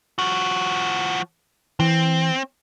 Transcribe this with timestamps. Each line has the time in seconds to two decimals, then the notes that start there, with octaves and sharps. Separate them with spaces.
0.19 F3 F#4
1.80 E3 C4